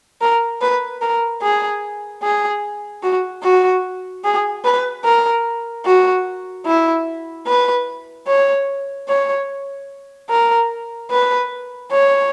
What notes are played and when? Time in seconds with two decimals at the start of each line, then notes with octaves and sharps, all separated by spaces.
0.21 A#4
0.61 B4
1.01 A#4
1.42 G#4
2.23 G#4
3.03 F#4
3.43 F#4
4.24 G#4
4.65 B4
5.04 A#4
5.86 F#4
6.66 E4
7.46 B4
8.27 C#5
9.08 C#5
10.30 A#4
11.10 B4
11.91 C#5